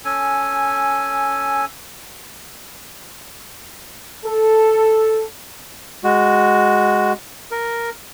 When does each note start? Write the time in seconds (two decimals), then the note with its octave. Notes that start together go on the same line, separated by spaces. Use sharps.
0.05 C#4 A4 G#5
4.26 A4
6.04 G#3 F#4
7.52 A#4